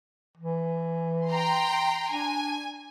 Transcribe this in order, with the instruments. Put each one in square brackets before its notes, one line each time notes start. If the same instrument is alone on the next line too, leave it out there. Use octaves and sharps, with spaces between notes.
[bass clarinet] E3
[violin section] G5 A#5 C6
[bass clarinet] D4 [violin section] G#5